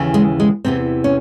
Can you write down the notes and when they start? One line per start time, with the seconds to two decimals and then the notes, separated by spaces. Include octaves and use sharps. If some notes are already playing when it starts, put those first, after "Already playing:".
Already playing: D#2 C#3 E3
0.14 G#3
0.40 G#3
0.65 E2 C3 E3 C4
1.04 C#4